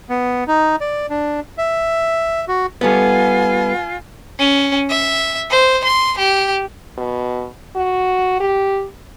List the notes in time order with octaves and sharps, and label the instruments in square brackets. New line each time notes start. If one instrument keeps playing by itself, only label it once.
[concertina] B3
D#4
D5
D4
E5
F#4
[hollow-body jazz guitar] G3 A3 B3 [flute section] F4 G#5
[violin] C#4
E5
C5
C6
G4
[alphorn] B2
F#4
G4